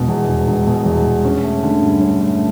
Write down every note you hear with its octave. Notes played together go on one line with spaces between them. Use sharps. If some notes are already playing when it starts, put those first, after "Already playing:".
Already playing: E1 B2
E2
E1
E1
B2
E2
E1
C#4
A3
D3
G2
C#4
A3